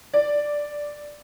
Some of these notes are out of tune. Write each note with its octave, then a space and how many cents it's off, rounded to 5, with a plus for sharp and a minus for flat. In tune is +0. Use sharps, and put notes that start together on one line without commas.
D5 +0